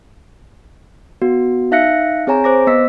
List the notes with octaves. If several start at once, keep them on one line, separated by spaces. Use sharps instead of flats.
B3 F#4
D#4 E5 F5 F#6 A#6 C#7
C4 G#4 C#5 G#5 A#5
C5 D6 A#6
B3 D#5 E6 B6